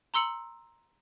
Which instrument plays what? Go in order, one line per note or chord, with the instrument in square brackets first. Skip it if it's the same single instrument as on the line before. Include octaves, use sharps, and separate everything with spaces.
[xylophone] A#5 C6 E6 C#7 F#7